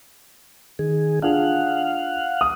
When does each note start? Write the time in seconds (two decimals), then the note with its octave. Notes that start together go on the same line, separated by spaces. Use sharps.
0.79 D#3 G#4
1.22 D4 F4 G#4 F5 F#5
2.41 D#6